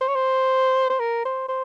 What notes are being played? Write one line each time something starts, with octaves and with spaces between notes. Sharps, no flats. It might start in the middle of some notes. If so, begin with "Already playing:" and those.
C5
C#5
C5
C5
A#4
C5
C5